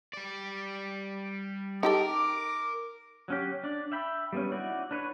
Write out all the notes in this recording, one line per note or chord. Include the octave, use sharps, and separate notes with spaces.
G3 D5
D#4 G4 A4 A#4 D6
F#3 C#4 G4
D4 D5
E5 G5 B5
G3 B3 C#4
D#4 E4 F#4 D5
D4 B4 C#5